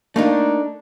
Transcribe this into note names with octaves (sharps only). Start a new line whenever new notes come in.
A3 A#3 D4 D#4